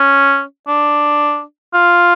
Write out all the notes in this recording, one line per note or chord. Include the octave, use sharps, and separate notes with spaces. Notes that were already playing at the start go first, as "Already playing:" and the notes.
Already playing: C#4
D4
F4